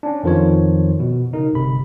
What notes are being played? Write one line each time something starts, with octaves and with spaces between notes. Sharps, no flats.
C#4 D4
F2 D#3 F3 F4 C#5
B2
C#3 D#4 A#4
G1 C3 B5